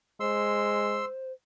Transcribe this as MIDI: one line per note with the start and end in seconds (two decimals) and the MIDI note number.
0.20 1.06 56
0.20 1.32 72
0.20 1.05 84
0.20 1.05 88